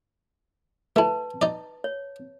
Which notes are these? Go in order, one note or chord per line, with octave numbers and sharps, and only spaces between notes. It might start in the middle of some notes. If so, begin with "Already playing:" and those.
A3 E4 B4 A5
D#4 D5
C#5